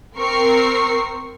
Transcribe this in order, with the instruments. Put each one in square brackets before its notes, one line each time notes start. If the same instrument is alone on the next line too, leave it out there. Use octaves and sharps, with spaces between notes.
[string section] C4 A#4 C#6 C7